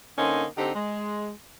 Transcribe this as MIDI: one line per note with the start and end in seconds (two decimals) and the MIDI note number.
0.18 0.44 50
0.18 0.44 58
0.18 0.44 60
0.18 0.44 61
0.18 0.44 63
0.57 0.70 50
0.57 0.70 60
0.57 0.70 63
0.57 0.70 67
0.75 1.30 56